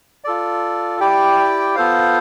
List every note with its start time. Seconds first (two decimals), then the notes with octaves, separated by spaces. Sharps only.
0.24 F4 A4 D5
1.00 E4 G4 D5 G5
1.75 B3 F4 A4 C5 F5